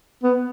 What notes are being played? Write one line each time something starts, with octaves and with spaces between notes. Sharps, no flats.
B3